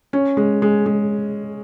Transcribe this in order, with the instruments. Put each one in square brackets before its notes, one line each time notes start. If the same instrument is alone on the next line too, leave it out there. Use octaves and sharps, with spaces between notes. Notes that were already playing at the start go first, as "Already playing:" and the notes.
[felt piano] C#4
G#3
G#3
G#3